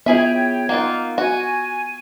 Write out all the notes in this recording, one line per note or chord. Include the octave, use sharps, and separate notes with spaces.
B3 E4 F4 G#4 C#5 E5 G5
A#3 D#4 F4 F#5
F#4 G#5